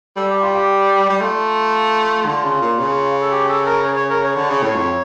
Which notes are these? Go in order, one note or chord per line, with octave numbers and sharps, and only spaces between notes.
G3 A4
G4
F4
G4
G3
A3 F4
D3
C#3
A#2
C#3
A4
G4
A4
A#4
C#5
C#5
A#4
C#5
D3
C#3
A2
F2